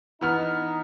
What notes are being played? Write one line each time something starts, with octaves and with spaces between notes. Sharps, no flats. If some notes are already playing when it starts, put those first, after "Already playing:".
E3 B3 D#4 F6